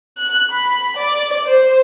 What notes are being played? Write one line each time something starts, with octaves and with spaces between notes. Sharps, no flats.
F#6
B5
D5
C5